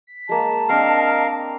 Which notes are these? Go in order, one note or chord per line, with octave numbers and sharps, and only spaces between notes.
B6
G#3 A#3 A5
C4 D4 A#4 D#5 F5